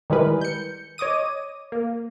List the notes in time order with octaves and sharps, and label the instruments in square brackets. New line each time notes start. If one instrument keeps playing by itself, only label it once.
[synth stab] D#3 G3 G#3 E4 A#4 B4
G6 C#7
C#5 D#5 D6 D#6 D#7
A#3